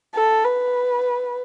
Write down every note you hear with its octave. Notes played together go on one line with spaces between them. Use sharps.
A4
B4